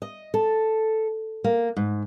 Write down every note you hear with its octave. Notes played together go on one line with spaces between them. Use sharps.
D#5
A4
A#3
G#2